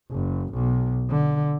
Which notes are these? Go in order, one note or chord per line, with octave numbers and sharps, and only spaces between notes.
F#1
B1
D3